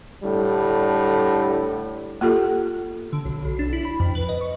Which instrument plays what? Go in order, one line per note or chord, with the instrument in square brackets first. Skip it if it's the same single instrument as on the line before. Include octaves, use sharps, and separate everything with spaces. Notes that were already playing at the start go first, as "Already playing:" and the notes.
[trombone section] A2 D3 G3
[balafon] A#3 F4 G4 A4
[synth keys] D3
B1
B1
D4
E4
B5
F2
B4
D#5
C#6